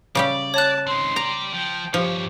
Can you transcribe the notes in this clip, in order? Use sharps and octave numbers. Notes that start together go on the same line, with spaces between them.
C#3 G3 G4 D5
C#5 A5 F#6
C4 D#4 C6
G4 D5 A#5
F3 G5
G2 F3 G4 C#5